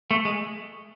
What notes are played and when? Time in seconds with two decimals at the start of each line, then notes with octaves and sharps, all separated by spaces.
0.11 A3
0.25 G#3